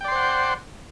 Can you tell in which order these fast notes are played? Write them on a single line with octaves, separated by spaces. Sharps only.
G5 D5 C6 C5 F#5